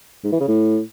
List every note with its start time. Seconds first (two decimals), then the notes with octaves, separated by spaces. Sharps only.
0.24 G#2
0.32 E3
0.40 C#3
0.48 A2